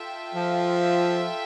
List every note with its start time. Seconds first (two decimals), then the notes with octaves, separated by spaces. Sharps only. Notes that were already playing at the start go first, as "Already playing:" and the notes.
Already playing: F4 A4 E5 G5
0.35 F3